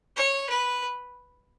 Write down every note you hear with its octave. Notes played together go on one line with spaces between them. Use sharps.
C#5
B4